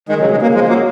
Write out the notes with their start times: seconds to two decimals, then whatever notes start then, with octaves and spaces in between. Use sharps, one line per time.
0.09 D#3 G#3
0.20 C#3 F#3
0.31 B2 G#3
0.42 C#3 A#3
0.54 F3 G#3
0.69 F#3 A#3